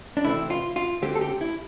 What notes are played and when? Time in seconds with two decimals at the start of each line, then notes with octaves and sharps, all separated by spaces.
0.17 D4
0.24 D2 C3 E3 A3 C4 E4
0.50 F4
0.76 F4
1.02 D2 D3 A3 C4 G4
1.15 A4
1.21 G4
1.41 E4